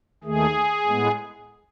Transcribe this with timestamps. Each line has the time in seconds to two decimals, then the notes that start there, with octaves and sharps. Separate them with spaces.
0.24 D#2 D#3 A3 G#4
0.86 A2 G#3 B3